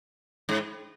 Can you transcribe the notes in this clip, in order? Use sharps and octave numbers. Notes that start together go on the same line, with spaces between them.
G#2